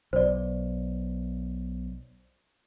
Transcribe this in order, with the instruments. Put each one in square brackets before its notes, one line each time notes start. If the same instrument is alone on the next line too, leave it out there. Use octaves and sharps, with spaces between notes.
[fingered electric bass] B1 [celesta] C5 D5